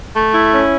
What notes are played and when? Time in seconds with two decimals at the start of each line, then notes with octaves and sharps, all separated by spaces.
0.15 A3
0.34 E4
0.53 C#4